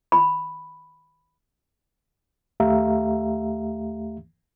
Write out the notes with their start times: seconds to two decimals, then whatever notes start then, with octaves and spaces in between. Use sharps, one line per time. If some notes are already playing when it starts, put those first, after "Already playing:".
0.12 B5
2.60 D#2 A3 G4 E5 F5 A#5